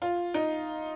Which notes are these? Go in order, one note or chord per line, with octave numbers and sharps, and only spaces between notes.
F4
D#4